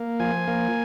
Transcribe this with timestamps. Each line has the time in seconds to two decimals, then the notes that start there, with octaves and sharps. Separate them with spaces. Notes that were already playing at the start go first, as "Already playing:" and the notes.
Already playing: A#3
0.20 F3 G#5
0.48 A#3